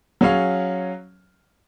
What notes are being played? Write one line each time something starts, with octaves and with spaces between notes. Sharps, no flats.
F#3 C#4 G#4 C#5 F5